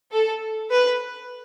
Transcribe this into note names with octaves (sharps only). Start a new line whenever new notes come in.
A4
B4